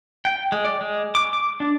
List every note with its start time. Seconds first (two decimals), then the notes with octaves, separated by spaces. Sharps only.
0.25 G5
0.52 G#3
0.65 D5
0.81 G#3
1.15 D6
1.33 D6
1.60 D4